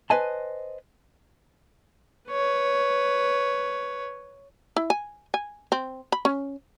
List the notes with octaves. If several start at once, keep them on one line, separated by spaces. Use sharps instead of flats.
B4 C5 D#5 G#5 A5
B4 C#5
E4
G#5
G#5
C4
B5
C#4